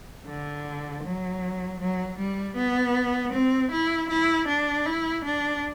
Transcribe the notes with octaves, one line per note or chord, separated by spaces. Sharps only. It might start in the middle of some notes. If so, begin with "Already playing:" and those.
D3
F#3
F#3
G3
B3
C4
E4
E4
D4
E4
D4